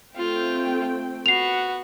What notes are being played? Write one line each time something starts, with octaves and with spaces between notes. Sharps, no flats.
A3 C4 F4 G5
B3 F#4 C7 F7